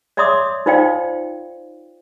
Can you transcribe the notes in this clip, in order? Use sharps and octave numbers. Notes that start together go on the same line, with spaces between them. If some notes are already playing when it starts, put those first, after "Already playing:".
C#5 D5 E5 C6 D6 D#6
D#4 F4 C5 D5 F5 G5